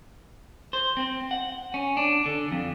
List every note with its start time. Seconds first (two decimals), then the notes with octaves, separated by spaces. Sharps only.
0.73 C5
0.97 C4
1.31 F#5
1.74 C#4
1.97 D4
2.26 D3
2.52 F2